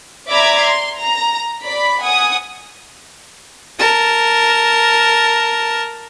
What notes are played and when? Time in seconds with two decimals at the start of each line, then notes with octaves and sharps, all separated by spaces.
0.29 D5 E5 A#5 B5 D6 G#6
0.63 C6
0.99 A#5
1.62 D5 B5
2.01 F#5 G#5 D#6
3.79 A#4 A5